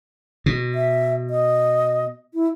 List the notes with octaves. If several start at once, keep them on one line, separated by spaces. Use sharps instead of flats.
B2
E5
D#5
E4